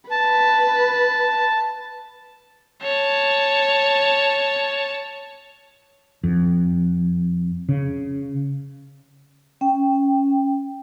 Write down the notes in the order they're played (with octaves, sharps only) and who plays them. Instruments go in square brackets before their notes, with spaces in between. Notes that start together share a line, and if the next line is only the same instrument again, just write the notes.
[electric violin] B4 [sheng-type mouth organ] A5
[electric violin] C#5 A5
[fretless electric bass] F2
C#3
[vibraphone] C#4 G5